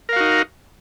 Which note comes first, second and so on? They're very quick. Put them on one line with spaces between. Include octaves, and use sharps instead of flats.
A#4 F5 F#4 D#4